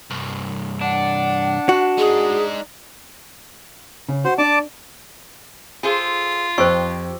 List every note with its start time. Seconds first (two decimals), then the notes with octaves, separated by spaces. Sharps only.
0.10 C2 G2
0.81 D4 F#5
1.69 F#4
1.98 G#3 D#4 G#4
4.09 C#3
4.25 F#4 C5
4.38 D4 D5 A5 D6
5.83 F4 G#4 A4 C5
6.58 F2 G4 C5 C#6 E6